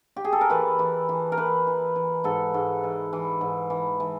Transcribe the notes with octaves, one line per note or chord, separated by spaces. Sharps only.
G4
G#4
A4
A#4
E3 B4
E3
E3
A#4
E3 B4
E3
E3
G#2 A4
G#2
E3
E3
G#2
E3
E3